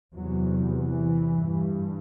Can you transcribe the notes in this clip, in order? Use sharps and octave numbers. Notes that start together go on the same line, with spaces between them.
E2 C3 F#3
E3
G2